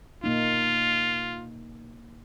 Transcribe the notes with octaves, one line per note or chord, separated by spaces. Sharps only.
B2 A#3 D#4 F4